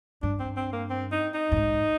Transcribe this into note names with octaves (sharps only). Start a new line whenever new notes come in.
G2 D4
C4
C4
A#3
C4
D#4
D#4
G2
G#2